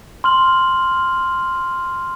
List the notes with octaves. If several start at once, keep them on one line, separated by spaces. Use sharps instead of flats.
C6 F6 F#7